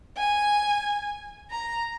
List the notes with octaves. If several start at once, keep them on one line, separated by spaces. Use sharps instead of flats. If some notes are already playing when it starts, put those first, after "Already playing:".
G#5
A#5